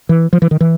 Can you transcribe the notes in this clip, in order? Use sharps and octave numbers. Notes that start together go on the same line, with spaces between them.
E3
F3
E3
D#3
E3